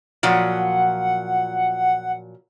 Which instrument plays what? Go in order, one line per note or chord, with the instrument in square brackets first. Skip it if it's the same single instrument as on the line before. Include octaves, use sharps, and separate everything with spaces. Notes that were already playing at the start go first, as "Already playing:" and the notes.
[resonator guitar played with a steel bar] A#2 F3 F#3 [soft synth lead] F#5